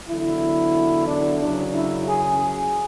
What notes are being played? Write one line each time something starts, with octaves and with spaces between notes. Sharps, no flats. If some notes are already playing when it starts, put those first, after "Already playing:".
E2 D3 F#3 E4
D4
F#2 C#3 F#3 D4
E4
G#4
G#4